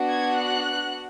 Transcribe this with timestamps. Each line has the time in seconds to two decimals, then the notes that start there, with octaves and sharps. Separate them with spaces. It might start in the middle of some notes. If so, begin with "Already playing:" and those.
Already playing: B3 D4 F#4
0.09 G#6
0.38 F#6